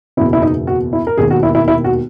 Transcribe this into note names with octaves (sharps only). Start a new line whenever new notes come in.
F#1 E2 B2 E4
E4
D#4
F#4
E4
A#4
E1 D#2 D#3 G#4
F#4
E4
E4
E4
F#4